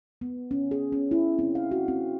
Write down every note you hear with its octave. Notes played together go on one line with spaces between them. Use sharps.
B3
C#4
G#4
C#4
E4
C4
F5
F#4
C4